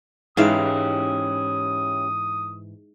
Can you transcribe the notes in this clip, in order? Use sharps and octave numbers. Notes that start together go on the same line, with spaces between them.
G#2 E3 C#4 E4 G4 F5 D#6